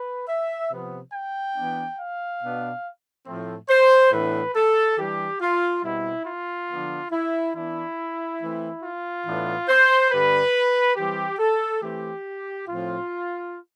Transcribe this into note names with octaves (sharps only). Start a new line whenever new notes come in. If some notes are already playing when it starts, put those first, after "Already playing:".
Already playing: B4
E5
C3 F3 B3
G5
E3 B3 D4
F5
B2 B3 D4
A2 F3 A3 C4
C5
A2 E3 B3 D4 B4
A4
E3 G3 D4 G4
F4
B2 G3 C4 E4
F4
D3 F3 B3 D4
E4
E3 B3 D4 E4
E3 A3 C4
F4
A2 E3 B3 D4
C5
G2 D3 G3 B4
E3 G3 C4 G4
A4
E3 A3 C4 G4
A2 F3 C4 F4